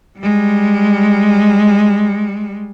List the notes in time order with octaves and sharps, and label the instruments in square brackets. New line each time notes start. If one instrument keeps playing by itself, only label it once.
[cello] G3 G#3